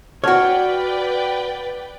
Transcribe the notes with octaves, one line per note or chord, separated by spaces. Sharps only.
F#4 B4 C#5 D5 F#5 G5 A5 F6